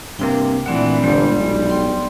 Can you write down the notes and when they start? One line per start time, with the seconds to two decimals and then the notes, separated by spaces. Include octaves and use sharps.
0.19 G2 C3 A#3 G5
0.66 A#2 E3 A3 C4 D4 F#5
1.04 G1 G3 G#3 C5
1.38 B1
1.70 G5 C6